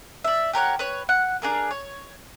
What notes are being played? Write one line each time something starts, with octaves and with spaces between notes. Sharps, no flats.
D5 E5
G4 A#4 C#5 F#5
B4 C#5
F#5
D4 G#4 A#4
C#5